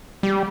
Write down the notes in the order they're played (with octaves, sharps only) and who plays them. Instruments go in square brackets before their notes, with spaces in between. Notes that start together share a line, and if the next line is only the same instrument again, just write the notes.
[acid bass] G3